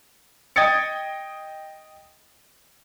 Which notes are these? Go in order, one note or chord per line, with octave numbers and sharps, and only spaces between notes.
D#5 G5 D#6 G#6 A6 C#7